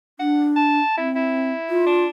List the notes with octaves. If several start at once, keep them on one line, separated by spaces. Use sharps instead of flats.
D4 F#5
A5
C4 E4
E4
F4
D4